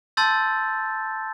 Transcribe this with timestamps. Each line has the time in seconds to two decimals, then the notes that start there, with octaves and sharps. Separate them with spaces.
0.17 A5 C6 E6 G6 A6